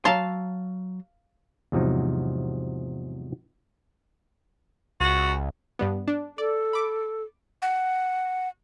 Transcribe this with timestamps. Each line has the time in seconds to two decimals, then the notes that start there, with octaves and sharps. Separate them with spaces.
0.05 F#3 F5 A5 A#5 C6
1.72 E2 G#2 C3 F3 F#3 D#4
5.01 C#2 F#4
5.79 G2 G3 B3
6.08 D4
6.38 A4 D5
6.73 B5 D6
7.62 F#5